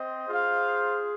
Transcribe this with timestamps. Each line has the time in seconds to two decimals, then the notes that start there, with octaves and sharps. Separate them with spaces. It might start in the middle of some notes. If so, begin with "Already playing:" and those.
Already playing: C4 C5 D#5
0.29 F4 G#4 C5 F5